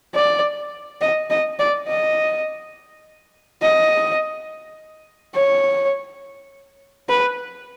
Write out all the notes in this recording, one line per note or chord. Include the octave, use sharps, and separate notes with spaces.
D5
D#5
D#5
D5
D#5
D#5
C#5
B4